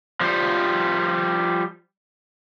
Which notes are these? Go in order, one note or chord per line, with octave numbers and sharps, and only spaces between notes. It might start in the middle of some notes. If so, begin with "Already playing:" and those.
F3 G3